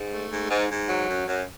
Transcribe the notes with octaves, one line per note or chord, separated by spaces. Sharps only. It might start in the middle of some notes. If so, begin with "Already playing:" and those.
Already playing: G#2
A3
G#2
G#2
G#2
F#3
F#2
F#2